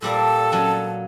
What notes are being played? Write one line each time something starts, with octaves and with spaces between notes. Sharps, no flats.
A#2 G3 A#3 A4 A5
F#3 C#4